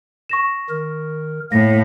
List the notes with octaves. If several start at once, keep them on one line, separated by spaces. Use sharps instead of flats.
C#6 A#6 E7
D#3 A#4
A2 A#3 A#6